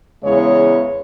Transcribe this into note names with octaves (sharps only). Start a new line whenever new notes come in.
E2 C#3 E3 G#3 C#5